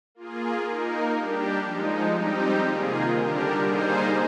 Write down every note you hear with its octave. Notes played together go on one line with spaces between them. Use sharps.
A#3 F4 G#4
A#3 D#4 A#4
G3 D4 G4
F3 G#3 D#4
G3 C4 D#4 G4
C3 D#3 A#3 F4 G#4
D3 G3 D4 G4 A#4
G3 A#3 D#4 G#4 C5